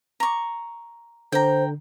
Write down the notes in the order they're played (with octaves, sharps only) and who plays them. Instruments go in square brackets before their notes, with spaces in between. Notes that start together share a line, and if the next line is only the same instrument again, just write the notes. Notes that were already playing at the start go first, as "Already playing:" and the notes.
[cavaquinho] A#5 C#6
[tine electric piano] D3 [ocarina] C5 [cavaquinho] G5 A#5